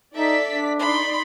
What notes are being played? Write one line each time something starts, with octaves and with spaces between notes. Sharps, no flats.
D#4 A4 D5 E5 B6
D4
D#4 D5 B5 C6